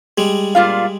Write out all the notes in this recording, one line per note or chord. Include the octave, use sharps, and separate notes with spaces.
G3 G#3
A#2 F4 F5